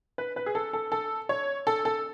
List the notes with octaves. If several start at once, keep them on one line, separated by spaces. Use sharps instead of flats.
B4
B4
G#4
A4
A4
A4
C#5
A4
A4